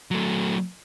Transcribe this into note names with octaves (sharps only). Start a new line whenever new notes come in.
F#3 A3